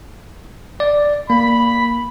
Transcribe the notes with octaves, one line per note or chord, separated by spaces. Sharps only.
D5
A#3 B5